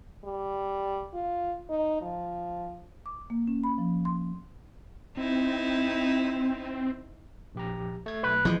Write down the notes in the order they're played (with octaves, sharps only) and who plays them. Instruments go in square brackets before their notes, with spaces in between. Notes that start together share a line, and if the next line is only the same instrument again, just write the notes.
[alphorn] G3
F4
D#4
F3
[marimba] D6
A#3
C#4
B5
F3
C6
[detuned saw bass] C4 [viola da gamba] D#4 E4
[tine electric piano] A#1 G4 A#5
A3 G#6
[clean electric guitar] B1 B4
[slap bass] E3 F3 [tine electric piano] G#3